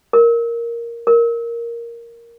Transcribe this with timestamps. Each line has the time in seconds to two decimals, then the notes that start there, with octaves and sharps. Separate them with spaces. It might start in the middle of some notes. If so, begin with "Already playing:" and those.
0.13 A#4
1.07 A#4